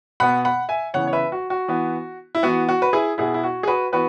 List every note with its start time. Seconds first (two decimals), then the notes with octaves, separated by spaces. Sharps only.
0.20 B2 B3 F#5 B5
0.45 F#5 B5
0.69 E5 G#5
0.94 C#3 E3 B3 C#5 F#5
1.07 C#5
1.13 B4 E5
1.32 F#4
1.50 F#4
1.68 E3 B3
2.35 E4
2.43 E3 B3 F#4
2.69 F#4
2.82 B4
2.93 E4 G#4
3.18 B2 B3 E4 G#4
3.34 E4
3.44 F#4
3.63 G#4
3.67 F#4 B4
3.92 E3 B3 F#4 B4